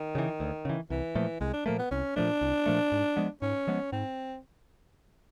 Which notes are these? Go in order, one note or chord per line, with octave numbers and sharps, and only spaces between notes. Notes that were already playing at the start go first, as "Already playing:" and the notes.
Already playing: D#3
C#3 E3
D2
C#3 E3
C2 E3
A#2 F3 A3
C2 G#3
D4
A#2 F3 A3 A#3
B3
C2 C#4
A#2 F3 A3 D4
C2
A#2 F3 A3
G#2
F3 G#3 B3
G#2 C#4
F3 G#3 B3
G#2 C4